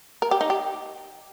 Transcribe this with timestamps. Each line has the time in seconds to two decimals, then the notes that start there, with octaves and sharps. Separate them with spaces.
0.22 A#4
0.31 G4
0.41 D#4
0.50 G4